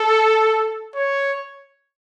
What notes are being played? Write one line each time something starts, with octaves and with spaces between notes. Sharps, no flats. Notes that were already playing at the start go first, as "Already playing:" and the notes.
Already playing: A4
C#5